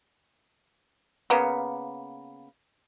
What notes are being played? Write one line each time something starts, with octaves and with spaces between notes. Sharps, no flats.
C#3 A#3 B3